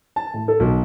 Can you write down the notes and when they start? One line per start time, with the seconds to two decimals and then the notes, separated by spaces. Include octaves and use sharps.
0.16 A5
0.34 A2
0.48 A4
0.60 B1